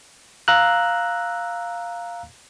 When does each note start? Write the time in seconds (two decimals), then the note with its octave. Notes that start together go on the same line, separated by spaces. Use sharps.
0.48 F5 A#5 E6 F#6